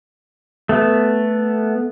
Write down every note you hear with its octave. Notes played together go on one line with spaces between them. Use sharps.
A3 B3